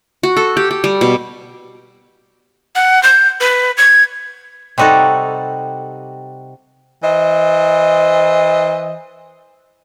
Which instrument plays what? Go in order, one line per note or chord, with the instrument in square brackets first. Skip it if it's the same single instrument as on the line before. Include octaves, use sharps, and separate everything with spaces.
[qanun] F#4
A4
G4
G4
G3
B2
[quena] F#5
G6
B4
G#6
[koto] C3 G3 D#4 F#4 A4
[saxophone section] E3 C5 D#5